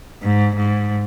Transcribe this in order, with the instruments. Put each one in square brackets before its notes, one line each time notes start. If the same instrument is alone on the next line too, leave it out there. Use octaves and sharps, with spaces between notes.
[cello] G#2
G#2